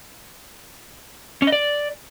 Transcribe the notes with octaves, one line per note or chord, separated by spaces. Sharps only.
C#4
D#5
D5